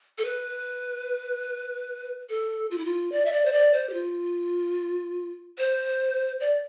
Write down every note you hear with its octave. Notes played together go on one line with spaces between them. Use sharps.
A4
B4
A4
F4
E4
F4
D5
E5
D5
C5
D5
C5
G4
F4
C5
D5